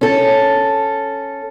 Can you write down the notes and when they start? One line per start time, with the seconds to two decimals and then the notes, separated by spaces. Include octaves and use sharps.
0.01 C#4 A4